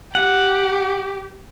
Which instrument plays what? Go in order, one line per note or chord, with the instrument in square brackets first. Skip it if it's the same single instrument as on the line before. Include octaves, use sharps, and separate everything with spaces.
[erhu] G4 [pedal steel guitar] F#5